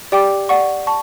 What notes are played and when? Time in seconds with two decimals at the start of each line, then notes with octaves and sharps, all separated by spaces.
0.12 G4 D5 G5 D6
0.49 D5 F#5 C#6
0.87 A5 C#6